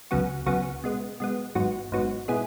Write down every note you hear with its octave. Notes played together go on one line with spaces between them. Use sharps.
C#2 C#3 F#3 B3 F#4
C#2 C#3 F#3 B3 F#4
B2 G#3 B3
B2 G#3 B3
G#1 G#2 F#3 B3 F#4
G#1 G#2 F#3 B3 F#4
B2 G#3 B3 E4 G#4